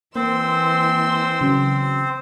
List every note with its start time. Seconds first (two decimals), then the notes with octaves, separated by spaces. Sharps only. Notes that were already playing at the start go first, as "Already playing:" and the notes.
0.16 E3 A#3 C4 C5 C6 E6
1.41 C#3 F#3